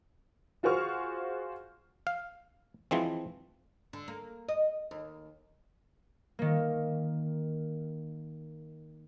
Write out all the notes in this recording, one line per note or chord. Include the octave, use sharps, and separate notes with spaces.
F4 F#4 G#4 C5 C#6 F6
F5
E3 F3 G#3 C4
D3
A#3
D#5
D#2
D#3 A#3